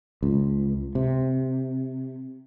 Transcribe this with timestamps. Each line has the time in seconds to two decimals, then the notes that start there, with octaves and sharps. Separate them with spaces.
0.23 C#2
0.95 C3